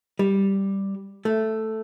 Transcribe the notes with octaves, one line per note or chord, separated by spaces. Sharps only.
G3
A3